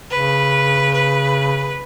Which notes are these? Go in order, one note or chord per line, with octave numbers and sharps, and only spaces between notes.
C#3 B4
B4